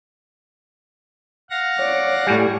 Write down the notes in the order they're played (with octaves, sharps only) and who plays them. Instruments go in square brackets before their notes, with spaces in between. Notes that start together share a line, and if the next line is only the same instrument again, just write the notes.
[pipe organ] F5 F#5 A#6
[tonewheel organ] C#5 [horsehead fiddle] D5
[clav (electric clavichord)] A2 G3 [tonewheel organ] G4 G#5